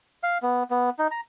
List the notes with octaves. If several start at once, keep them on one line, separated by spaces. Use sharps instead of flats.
F5
B3
B3
D#4
A#5